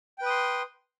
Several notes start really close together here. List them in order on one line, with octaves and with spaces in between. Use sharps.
G5 B4 D#6 C6